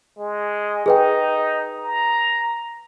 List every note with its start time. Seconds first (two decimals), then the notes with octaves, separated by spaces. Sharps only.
0.18 G#3
0.86 D#4 G#4 B4 G5
1.78 A#5